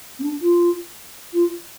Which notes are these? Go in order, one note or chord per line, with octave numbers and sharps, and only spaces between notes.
C4
D4
F4
F4